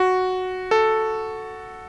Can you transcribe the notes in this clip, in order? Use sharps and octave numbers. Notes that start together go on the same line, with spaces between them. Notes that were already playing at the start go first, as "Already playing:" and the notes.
Already playing: F#4
A4